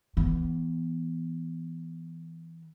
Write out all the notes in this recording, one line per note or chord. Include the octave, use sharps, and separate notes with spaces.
E3 B3